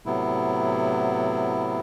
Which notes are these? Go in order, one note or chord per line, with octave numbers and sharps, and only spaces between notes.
A2 C3 F#3 B3 E4